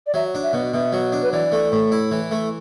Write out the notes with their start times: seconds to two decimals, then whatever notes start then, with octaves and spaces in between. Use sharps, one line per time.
0.07 D5
0.14 F#3 E5
0.35 D4
0.43 E5
0.53 B2
0.73 B2 E5
0.93 F#3
1.12 D4
1.23 B4
1.33 E3 D5
1.52 A3
1.72 A2
1.92 E4
2.11 E3
2.31 A3